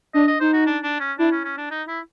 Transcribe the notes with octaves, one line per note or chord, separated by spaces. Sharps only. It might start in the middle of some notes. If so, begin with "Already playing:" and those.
D4 D#5
D#5
D#4 C5
F#4
D4
D4
C#4
D4 E4
C#4
C#4
D4
D#4
E4